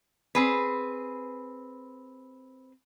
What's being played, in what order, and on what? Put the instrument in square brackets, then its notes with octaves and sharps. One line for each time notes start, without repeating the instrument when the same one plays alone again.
[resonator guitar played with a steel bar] C4 G#4 B4